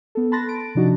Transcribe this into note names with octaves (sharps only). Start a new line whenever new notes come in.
B3 A4
A5 B5 C6 F#6 A6 A#6
D7
C3 F3 D4 D#4 F#4